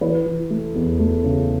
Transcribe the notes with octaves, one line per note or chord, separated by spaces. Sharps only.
E3 B4
E3
A3
E2
A3
C#3